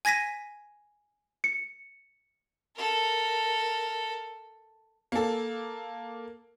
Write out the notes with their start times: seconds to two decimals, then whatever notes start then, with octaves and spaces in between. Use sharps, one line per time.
0.05 G#5 G#6 A#6 B6 D#7
1.44 C#7
2.75 A4 A#4
5.12 A#3 A4